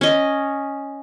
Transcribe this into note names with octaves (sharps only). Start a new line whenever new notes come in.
C#4 D#5